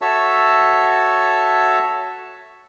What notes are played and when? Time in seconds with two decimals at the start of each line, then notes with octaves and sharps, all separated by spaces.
0.01 F#4 A4 C#5 E5 A5 E6